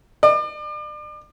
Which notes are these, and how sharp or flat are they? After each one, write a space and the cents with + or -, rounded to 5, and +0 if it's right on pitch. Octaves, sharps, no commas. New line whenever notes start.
D5 +40